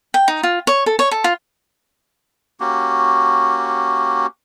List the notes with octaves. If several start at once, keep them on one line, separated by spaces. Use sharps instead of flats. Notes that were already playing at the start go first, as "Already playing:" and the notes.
G5
D#4
F4
C#5
A4
C#5
A4
F4
A#3 C#4 F#4 G4